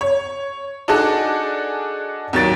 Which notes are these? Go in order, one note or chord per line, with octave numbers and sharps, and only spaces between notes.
C#5
D4 D#4 F#4 G#4 A4 D5
D#2 F#3 A6 D7